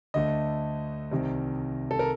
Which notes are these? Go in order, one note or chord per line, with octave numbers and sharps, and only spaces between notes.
D2 D3 A3 D#5
C2 C3 D#3
A4
A#4